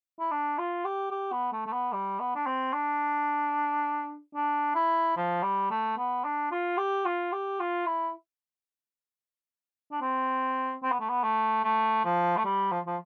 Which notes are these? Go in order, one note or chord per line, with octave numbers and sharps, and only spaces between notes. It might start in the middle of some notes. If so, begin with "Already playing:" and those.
E4
D4
F4
G4
G4
B3
A3
A3
B3
G3
B3
D4
C4
D4
D4
E4
F3
G3
A3
B3
D4
F4
G4
F4
G4
F4
E4
D4
C4
C4
B3
A3
B3
A3
A3
F3
A3
G3
F3
F3